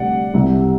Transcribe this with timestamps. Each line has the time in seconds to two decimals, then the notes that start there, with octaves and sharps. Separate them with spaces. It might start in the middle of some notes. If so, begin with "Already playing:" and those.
Already playing: D2 C3 G3 D5 F#5
0.34 C2 C3 G3